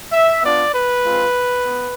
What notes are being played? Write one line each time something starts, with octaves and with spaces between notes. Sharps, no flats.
E5
B3 D4 F4 D5
B4
G#3 C4 F4
B3